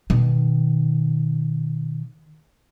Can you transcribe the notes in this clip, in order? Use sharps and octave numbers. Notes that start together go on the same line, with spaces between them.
B2 D#3